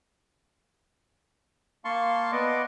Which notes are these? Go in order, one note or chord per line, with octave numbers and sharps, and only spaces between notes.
A#3 F5 A5 C6 C#6
B3 D5 D#5